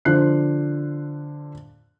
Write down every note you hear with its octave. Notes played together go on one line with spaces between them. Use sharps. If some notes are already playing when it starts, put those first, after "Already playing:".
D3 F3 C5 F#6 C7